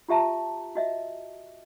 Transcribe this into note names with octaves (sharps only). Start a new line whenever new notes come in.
F4 G4 E5 A5 A#5
F#4 D#5 E5